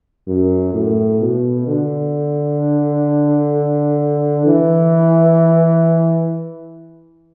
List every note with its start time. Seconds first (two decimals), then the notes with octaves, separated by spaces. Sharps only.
0.28 F#2
0.74 A2
1.21 B2
1.67 D3
4.46 E3